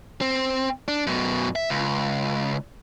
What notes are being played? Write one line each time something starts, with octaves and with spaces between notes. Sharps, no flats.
C4
D4
F#2 B2
E5
C#2